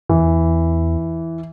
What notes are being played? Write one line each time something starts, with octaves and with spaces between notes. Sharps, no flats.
E2 E3